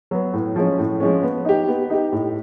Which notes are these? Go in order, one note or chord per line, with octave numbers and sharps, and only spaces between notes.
F#3 B3
A2
F3 G#3 C#4
A2
F3 G#3 C#4
B3
D#4 G4
B3
D#4 G4
A2